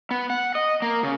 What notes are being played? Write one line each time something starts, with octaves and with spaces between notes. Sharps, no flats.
B3
F#5
D#5
A#3
C#3